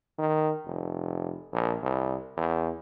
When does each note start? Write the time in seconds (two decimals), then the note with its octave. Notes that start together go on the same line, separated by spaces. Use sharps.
0.18 D#3
0.66 F1
1.53 A#1
1.83 C2
2.37 E2